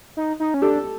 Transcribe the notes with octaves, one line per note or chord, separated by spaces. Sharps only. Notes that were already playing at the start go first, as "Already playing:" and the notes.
D#4
D#4
C#4
D4 G4 A4